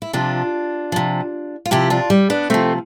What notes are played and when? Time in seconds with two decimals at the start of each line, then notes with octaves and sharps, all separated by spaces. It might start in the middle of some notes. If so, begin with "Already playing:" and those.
0.02 E4
0.13 C3 F3 D4 F4
0.92 C3 F3
1.66 F4
1.71 C3 F3 E4 G4
1.90 D4 F4
2.10 G3
2.30 B3 D4
2.50 C3 F3 A3 C4